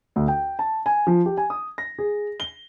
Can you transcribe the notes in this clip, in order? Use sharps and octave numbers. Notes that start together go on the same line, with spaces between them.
D2
G5
A5
G#5
F3
G4
G#5
D#6
A#6
G#4
G7